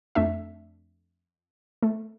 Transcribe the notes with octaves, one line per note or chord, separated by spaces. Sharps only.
F2 A3 D4 E5
A3